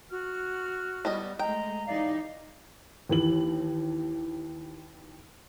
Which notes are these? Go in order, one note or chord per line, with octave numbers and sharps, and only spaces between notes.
F#4 F6
G3 B3 D#5
G#3 A3 D#5 G5 A#5
E3 D#4 G4 D5 F5
D#2 E3 F#7